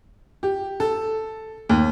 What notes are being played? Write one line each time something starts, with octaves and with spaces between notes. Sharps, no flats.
G4
A4
D#2